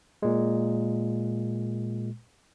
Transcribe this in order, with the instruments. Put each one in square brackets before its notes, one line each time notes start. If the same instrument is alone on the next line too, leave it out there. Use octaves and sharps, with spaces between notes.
[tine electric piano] A#2 G#3